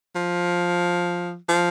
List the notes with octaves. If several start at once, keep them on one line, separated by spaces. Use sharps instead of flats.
F3
F3